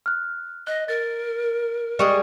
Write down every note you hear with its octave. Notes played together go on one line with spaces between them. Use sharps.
F6 F#6
D#5 F#6
A#4 A6
G3 G#3 G#4 C#6 C#7